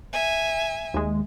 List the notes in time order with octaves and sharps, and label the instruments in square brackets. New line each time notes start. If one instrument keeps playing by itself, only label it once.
[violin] E5 G#5
[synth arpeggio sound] D#2 G#3